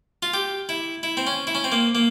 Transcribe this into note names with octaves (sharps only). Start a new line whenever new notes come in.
F4
G4
E4
E4
C4
C#4
E4
C#4
C4
A#3
A#3